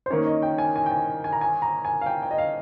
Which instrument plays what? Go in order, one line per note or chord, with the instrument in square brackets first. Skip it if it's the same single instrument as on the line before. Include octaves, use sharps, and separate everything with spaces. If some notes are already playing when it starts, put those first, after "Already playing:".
[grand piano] C5
[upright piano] D#3 A#3 C#4 [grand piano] C#5
[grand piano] D#5
G5
G#5
G#5
G5
G#5
G#5
A#5
G#5
A#5
G#5
F5
G5
G5
D#5
F5